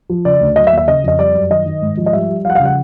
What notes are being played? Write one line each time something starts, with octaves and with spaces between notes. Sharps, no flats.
F3
C#3 D5
D2
F#3 D#5
E5
D#2
E5
C#3 D#5
F2 D#5
G3 D5
F#2
D#3 D#5
D#3
G#2
F3
D#5
G3 E5
G3
F3 F5 F#5
F5
C#3
F#5